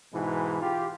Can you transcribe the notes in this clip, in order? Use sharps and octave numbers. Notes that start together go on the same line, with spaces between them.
G#2 B2 E3
F4 G4